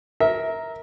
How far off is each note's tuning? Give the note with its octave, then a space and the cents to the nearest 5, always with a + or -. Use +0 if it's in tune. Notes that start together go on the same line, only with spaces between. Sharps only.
A#4 +0 E5 -25